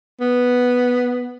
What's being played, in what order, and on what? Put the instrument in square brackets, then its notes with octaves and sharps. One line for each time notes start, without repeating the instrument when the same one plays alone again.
[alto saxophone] B3